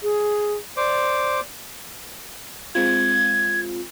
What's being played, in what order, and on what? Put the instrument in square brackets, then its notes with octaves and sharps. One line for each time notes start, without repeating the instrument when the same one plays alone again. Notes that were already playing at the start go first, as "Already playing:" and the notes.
[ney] G#4
[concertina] C5 D6 [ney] D5
[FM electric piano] G#3 C4 F4 [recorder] G#6